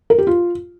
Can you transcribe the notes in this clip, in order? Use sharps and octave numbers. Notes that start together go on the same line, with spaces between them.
A#4
G4
F4